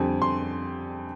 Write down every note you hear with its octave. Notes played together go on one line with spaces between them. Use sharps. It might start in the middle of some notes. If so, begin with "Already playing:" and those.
Already playing: F2 D3 G3 C4 G#5
C6